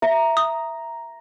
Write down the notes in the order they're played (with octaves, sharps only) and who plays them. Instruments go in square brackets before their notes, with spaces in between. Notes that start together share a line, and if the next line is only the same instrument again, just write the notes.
[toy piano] E5 [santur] A#5
[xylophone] D#6